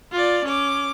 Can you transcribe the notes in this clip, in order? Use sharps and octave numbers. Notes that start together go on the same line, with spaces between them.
F4 D5
C#4 D6